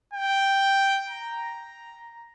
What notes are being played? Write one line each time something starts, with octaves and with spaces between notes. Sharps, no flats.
G5
A#5